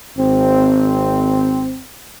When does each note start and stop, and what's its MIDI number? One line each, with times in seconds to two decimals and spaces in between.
0.18 1.81 32
0.18 1.81 60